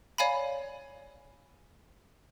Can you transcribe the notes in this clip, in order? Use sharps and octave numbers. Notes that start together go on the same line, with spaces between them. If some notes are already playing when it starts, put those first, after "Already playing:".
C#5 D5 F5 G#5 A#5 B5